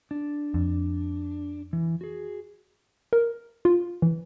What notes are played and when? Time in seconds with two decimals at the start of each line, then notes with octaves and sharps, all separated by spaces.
0.11 D4
0.54 F2
1.73 E3
2.01 F#4 G#4
3.13 A#4
3.65 F4
4.02 E3